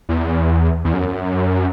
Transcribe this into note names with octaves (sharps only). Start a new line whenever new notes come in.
E2
E2
F#2